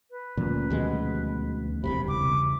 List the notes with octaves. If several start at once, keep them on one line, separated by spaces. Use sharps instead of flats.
B4
D2 A#2 F3 C#4
D#2 B2 G#3
E1 C2 C3 B5
E2 C#3 D6